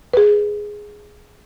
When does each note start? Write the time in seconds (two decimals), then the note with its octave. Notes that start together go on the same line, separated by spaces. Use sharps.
0.13 G#4 B4